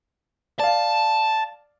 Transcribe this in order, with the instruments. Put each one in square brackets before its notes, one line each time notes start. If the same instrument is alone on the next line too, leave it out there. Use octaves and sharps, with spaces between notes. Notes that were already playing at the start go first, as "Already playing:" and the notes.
[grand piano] D5 F5 [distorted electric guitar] A5